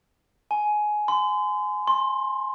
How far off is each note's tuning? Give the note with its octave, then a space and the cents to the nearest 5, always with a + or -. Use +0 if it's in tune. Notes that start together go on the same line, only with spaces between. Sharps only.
G#5 +15
C6 -35
C6 +25